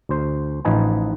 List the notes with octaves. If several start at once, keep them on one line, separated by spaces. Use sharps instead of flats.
D2 C5
A1 F3 D#4 B4 G#5